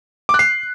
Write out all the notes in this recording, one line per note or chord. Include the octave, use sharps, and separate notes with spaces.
D6
F#6
C7